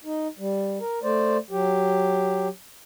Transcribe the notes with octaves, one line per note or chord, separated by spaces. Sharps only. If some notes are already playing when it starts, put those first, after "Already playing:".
D#4
G3
A#4
A3 C5 D5
F#3 G4